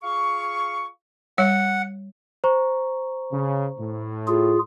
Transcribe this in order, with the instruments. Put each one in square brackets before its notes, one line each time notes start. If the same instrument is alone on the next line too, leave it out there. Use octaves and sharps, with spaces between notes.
[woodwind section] F4 G#4 F5 C#6
[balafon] G3 C#5 [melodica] F#5
[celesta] C5 A#5 C#6
[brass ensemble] C#3
A2
[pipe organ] F4 G#4